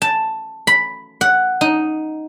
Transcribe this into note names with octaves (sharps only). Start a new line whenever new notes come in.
A5
B5
F#5
D#4